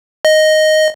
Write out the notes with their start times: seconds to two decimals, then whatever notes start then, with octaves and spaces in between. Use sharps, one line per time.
0.25 D#5